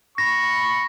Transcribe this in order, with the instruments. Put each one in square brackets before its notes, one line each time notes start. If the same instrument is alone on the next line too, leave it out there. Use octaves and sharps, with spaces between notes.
[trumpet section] B5 C#6 [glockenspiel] A#6